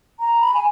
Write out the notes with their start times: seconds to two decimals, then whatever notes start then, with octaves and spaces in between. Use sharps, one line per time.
0.20 A#5
0.41 B5
0.54 G#5